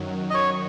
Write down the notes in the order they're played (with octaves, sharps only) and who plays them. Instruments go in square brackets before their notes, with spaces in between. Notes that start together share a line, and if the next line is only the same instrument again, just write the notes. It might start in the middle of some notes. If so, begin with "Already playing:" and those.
Already playing: [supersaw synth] F#2 D#3 F#3
[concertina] D#5
C#5